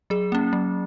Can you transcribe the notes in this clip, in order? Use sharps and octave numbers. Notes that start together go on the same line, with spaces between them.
F#3 G#4
A#3 C#4
F#3